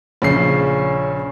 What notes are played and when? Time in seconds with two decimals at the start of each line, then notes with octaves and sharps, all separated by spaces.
0.22 A#1 C#3 C#4 C7